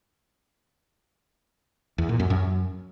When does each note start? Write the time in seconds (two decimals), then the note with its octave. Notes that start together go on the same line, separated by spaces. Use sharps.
1.98 E2
2.09 A#2
2.20 F#2
2.30 F#2